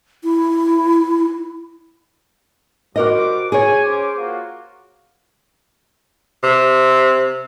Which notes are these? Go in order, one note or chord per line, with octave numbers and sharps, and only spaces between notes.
E4
G3 F#4 A#4 C5 D#5 D6
G#4 C#5 G#5
C#4 C5 D6
A#3 F4 F#4
C3